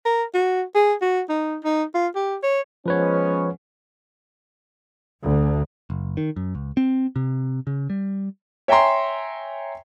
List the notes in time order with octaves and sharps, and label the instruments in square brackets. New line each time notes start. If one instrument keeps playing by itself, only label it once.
[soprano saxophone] A#4
F#4
G#4
F#4
D#4
D#4
F4
G4
C#5
[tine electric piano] F3 B4 C#5 [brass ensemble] G#3 B3 C#4
[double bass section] D2
[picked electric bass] F#1
D#3
F#2
C#2
C4
C3
C#3
G3
[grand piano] C#5 E5 G5 G#5 A#5 C6